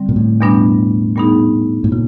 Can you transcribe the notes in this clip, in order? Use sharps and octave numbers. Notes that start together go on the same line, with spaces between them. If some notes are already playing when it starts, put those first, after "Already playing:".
Already playing: D3 G3 C4
A#2
A2
E2 B2 G3 B3 D4
A#2 G3 B3 D#4 G#4
A2
A#2 C#3